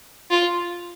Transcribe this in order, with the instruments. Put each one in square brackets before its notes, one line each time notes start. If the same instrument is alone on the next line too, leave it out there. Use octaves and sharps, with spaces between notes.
[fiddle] F4